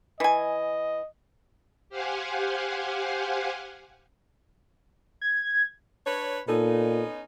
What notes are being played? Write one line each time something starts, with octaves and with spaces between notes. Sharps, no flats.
E3 D#5 G#5
G4 C5 F5 F#5 G#5
G#6
D4 B4 C#5
A#2 B3 C#4 D#4 A4